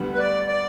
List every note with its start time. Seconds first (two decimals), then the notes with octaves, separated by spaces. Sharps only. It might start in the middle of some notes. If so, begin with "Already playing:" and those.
Already playing: D2 D3 G3 B3
0.14 B4
0.19 D5
0.47 D5